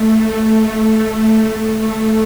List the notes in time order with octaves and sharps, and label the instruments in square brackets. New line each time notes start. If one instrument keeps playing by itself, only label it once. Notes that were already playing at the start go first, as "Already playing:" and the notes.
Already playing: [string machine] A3
A3